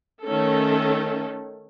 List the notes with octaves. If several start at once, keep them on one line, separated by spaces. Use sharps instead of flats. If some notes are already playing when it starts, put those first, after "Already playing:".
D#3 A3 C#4 A4